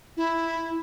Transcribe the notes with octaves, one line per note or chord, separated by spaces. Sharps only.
E4